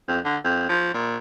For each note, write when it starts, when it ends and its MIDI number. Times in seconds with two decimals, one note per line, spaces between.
0.08 0.19 41
0.25 0.37 50
0.44 0.64 41
0.69 0.90 53
0.94 1.17 46